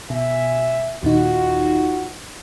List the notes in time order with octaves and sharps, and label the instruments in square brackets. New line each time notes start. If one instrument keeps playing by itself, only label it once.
[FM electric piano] B2 [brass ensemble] E5 G#5
[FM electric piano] D#2 A#2 D#4 [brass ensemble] F4 F#4